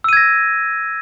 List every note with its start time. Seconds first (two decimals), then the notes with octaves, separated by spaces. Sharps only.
0.04 E6
0.09 D#7
0.13 G#6
0.17 A#6